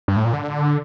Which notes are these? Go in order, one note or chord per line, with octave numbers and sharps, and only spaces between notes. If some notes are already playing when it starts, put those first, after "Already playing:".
G2
A2
A#2
D3